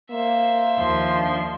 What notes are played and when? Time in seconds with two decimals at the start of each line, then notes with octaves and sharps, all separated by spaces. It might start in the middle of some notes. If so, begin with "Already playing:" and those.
0.11 A#3 C5 E5
0.78 D#2 F3 C6
1.15 D4